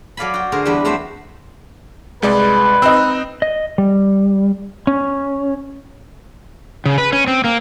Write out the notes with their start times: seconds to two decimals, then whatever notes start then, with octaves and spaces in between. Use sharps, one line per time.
0.17 F#3 A4 D5 F5 G#5 B5
0.34 F#4 G5
0.52 D3 G#4 A#4 C5
0.65 E2 G3 D4 B4 E5
0.85 F#3 A3 C4 C5 E5
2.22 C2 G#3 B4 D5
2.82 C4 D#4 E6 F#6
3.42 D#5
3.78 G3
4.87 C#4
6.86 C#3
6.98 B4
7.13 C#4
7.27 C4
7.44 A#3